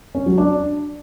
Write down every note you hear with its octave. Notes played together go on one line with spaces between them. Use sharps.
C#4
F#3
D4